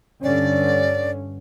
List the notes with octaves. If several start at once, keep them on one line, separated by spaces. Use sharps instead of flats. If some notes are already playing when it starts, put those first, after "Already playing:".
G2 D3 C#4 D5